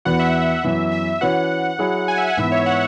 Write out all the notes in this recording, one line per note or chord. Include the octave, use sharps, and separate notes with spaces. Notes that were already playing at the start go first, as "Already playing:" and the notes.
E2 E3 B3 F#4 F#5
E5
F#5
E5
F#2 E3 B3
E5
E3 C#4 F#4 B4 F#5
F#3 E4 G#4
G#5
E5
F#5
G#2 E3 B3 E5
C#5
F#5